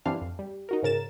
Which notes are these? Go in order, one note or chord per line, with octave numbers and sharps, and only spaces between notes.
G2 E3 C4 D4 F5
F2
G3
D#4 F#4 A#4
G#2 C#3 A#4 A6 E7